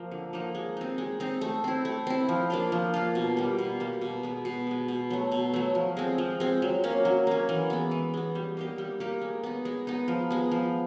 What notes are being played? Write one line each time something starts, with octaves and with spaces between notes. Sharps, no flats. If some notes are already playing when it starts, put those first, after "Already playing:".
Already playing: F3 A#3
D3
F3 A#3 D#4
G#3
C4 D#4
G#3
C4 D#4
A3
C4 E4
A3
C4 E4
F3
A#3 D4 F4
F3
A#3 D4 F4
B2
G3 A#3
B2
G3 A#3
B2
G#3 B3
B2
G#3 B3
B2
F#3 A3
B2
F#3 A3
F3
G#3 C4
F3
G#3 C4
F#3
A#3 C#4
F#3
A#3 C#4
E3
G#3 B3
E3
G#3 B3
G3
A#3 D#4 G4
G3
A#3 D#4 G4
G#3
B3 D#4
G#3
B3 D#4
F3
G#3 B3
F3